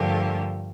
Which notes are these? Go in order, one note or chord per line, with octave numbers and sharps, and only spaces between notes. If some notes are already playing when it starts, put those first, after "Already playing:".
Already playing: G2 D3 F3 A3 G4 A#4